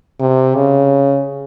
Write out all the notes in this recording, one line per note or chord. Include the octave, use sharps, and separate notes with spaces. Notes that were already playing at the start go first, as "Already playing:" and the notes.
C3
C#3